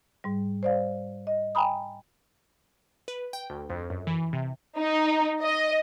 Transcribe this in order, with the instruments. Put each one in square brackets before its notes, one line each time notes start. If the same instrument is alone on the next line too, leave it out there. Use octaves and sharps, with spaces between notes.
[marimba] G#2 G3
C5 D5 F5
D#5
G5 G#5 A#5 B5 D#6
[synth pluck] B4
G5
D2
F2
F#2
E3
C3
[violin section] D#4
D#5